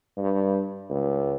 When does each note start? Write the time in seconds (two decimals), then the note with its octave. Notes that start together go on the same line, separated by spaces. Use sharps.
0.17 G2
0.89 C#2